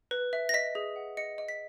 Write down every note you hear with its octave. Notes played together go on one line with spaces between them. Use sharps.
B4
E5
A#6
D#5 B6
G#4
F#5
D#5 C#7
D#5
B6